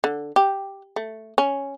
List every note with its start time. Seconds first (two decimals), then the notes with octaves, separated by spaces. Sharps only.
0.04 D3
0.36 G4
0.96 A3
1.38 C#4